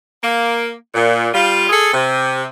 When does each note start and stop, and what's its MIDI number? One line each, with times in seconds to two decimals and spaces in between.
0.23 0.73 58
0.94 1.27 46
1.34 1.67 55
1.34 1.67 65
1.70 1.91 68
1.70 1.91 69
1.93 2.47 48